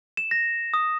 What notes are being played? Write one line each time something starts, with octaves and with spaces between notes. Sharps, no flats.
E7
A#6
D#6